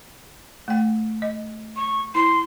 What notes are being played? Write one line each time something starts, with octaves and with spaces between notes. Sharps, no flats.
A3 G5
D#5
C#6
E4 C6